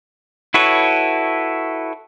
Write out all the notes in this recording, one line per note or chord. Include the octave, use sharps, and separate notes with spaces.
E4 F#4 A4 B4 C#5